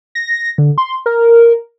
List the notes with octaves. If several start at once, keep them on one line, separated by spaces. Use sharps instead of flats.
A#6
D3
C6
A#4